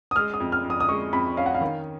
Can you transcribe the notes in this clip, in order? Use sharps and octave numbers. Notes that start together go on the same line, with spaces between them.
D#6
G#3 F6
D#6
F2
F6
F2
D#6
D#6
G#3 C#6
F2 B5
C#4 F5
F#5
F5
D#3